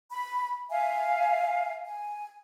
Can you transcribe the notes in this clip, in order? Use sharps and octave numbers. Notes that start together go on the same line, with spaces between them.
B5
E5 F5 G#5
G#5